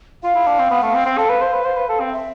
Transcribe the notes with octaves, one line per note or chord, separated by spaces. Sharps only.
F4 F5
E4
D4
C4
B3
A3
C4
C4
A4 F5
B4
C5
B4
C5
B4
A4
C4
F5
E5